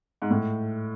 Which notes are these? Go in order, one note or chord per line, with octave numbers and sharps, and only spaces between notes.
G#2
A2